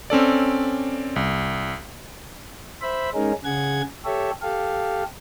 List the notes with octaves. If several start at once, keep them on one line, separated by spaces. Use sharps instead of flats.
C4 C#4 A4 D5
C2
C5 E5 B5
G#3 C#4 D#4 G#4 A#4
C#3 G#4 F#5 G#6
G4 A4 C#5 E5
G4 A4 F5